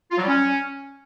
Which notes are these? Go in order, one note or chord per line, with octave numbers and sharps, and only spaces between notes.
F4
F#3
G3
C#4